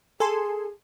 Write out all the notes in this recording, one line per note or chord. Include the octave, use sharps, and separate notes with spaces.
G#4 A4 G#5 C6